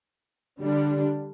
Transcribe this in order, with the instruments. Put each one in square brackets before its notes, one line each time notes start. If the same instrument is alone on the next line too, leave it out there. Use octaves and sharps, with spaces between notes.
[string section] D3 G3 D4